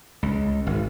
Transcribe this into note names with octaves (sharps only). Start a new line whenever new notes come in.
C#2
G#1